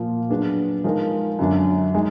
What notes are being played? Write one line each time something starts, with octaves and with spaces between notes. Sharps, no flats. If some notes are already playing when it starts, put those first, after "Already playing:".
Already playing: A#2 F3 A#3 F4 A#4
F#3 B3 D4 G#4
F3 G#3 D#4 A#4
F#2 D3 F#3 D4
G#3 D#4